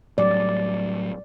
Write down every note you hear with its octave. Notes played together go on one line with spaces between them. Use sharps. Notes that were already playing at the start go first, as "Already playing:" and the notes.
A2 F#3 G3 D5